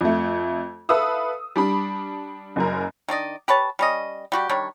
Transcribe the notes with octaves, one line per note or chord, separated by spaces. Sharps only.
F2 A3
A4 B4 E5 F5 D#6 E6
G3 D4 B5
F#1 F#2 A#4
D#3 D4 D5 D#5
G4 B4 C#5 A5
G3 C#4 D#5
G3 F#4 G4
D#3 G3 D4 C#5